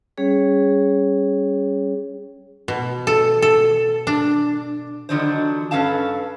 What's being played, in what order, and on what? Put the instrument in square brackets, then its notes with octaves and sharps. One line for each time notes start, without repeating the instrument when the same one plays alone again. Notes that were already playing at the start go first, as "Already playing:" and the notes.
[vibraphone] G3 C#4 G#4 C#5
[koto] B2
A4
A4
D4
[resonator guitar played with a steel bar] D3 D#3 F3 F#3 D4 C5
G2 C#4 A4 B4 F5 A5